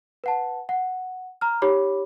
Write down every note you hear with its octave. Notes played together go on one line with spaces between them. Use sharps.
B4 F#5 A5
F#5
A#5 F6
D#4 G4 C#5 B5 D6